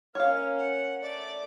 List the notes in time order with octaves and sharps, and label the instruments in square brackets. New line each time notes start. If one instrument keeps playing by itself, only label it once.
[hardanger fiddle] A#3 C#4 [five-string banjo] C#5 F5 [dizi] F6
[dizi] F#5
[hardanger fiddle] A3 D6 [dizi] D5